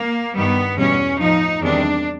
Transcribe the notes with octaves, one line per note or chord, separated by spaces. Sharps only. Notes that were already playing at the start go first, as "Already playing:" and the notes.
Already playing: A#3
G2 D#3 G3 B3
E2 B2 G3 C#4
A2 F3 D#4
E2 C3 D#3 G3 D4